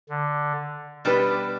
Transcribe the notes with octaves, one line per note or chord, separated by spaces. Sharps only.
D3
B2 G3 D4 G4 B4